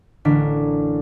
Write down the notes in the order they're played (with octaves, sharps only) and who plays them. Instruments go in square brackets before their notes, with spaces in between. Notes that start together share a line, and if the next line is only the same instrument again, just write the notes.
[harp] A1 D3 D4 A#4 B6